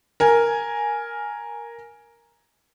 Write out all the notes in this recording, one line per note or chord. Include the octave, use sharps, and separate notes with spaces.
A#4 G#5